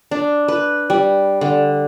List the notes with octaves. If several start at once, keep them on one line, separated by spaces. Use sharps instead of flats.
D4
B4
G3
D3